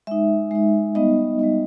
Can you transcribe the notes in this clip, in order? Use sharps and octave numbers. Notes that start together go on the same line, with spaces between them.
G#3 D#4 E5
G#3 D#4
G3 B3 D#4 D#5
G3 B3 D#4